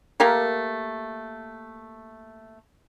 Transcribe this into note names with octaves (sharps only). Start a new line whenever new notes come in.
A3 A#3 G4 A#4